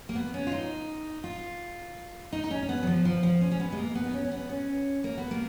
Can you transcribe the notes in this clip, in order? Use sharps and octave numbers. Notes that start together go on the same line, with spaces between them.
A#3
B3
C#4
F4
D#4
F4
D#4
D#4
C#4
C#4
B3
F#3
F3
F3
F3
C#4
C#4
B3
G#3
A#3
B3
D#4
C#4
C#4
B3
C#4
A#3
B3
A#3